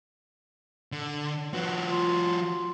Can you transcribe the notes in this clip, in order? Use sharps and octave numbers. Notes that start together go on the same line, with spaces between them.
D3
F3 F#4 B4
F4